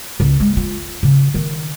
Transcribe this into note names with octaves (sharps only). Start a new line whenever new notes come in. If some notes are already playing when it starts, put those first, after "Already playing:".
C#2
G#3
F4
C#3
D#3